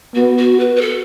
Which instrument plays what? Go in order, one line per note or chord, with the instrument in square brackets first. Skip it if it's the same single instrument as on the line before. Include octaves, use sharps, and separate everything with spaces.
[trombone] B3 [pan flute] F#4
[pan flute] F#4
B4
B4
A4